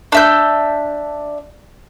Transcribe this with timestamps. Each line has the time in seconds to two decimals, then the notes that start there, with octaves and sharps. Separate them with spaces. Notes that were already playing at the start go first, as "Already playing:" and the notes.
0.12 D4 E5 G6